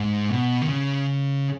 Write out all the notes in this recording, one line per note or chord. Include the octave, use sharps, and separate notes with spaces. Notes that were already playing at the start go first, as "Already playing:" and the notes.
Already playing: G#2
B2
D#3
C#3